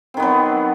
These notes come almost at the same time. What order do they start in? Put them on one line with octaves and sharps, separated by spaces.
C4 D#3 B3 F#3